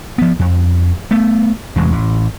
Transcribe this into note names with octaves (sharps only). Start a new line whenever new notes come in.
F3 B3
F2
A3 B3
A1 E2 C3 G#3
A1